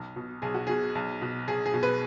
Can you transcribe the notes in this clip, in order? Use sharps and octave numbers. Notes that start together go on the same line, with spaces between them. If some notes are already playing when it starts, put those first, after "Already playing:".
Already playing: B1
B2
B1 G#4
F#4
B2 G#4
B1
B2
B1 G#4
G#4
B2
B4